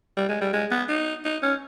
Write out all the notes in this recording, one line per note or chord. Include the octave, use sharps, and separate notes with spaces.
G3
G#3
G3
G#3
B3
D#4
D#4
C#4